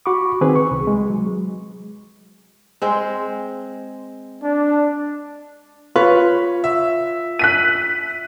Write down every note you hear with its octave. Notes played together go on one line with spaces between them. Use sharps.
F#4 B5 C#6 D6
D#3 C4 G#4 B4
C#6
C2
G#3
F#3
G#3 C4 C5
D4
F4 B4 C#5
E5
F#6 B6 D#7